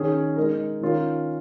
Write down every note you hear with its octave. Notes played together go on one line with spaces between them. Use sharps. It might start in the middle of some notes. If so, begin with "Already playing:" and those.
Already playing: D#3 C#4 G#4
G#3 D#4 A#4
D#3 C#4 F4 A#4